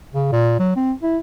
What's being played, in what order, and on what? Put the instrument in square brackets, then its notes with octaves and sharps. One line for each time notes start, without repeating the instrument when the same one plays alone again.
[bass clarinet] C#3
A#2
F#3
C4
E4